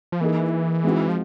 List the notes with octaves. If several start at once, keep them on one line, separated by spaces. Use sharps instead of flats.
F3
E3 A#3 D#4 G#4
G#3 C4 D#4 F#4
F3